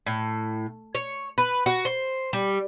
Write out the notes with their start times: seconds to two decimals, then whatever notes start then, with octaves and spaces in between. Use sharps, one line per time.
0.07 A2
0.95 C#5
1.38 B4
1.66 F#4
1.85 C5
2.33 G3